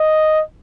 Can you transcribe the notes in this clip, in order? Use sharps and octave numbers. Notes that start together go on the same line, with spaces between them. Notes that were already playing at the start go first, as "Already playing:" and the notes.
Already playing: D#5